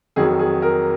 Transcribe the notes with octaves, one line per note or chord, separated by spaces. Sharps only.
F2 D#3 F#3 G#4
G#4
A#4